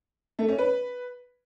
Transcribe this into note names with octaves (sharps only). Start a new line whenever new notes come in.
A3
C#4
B4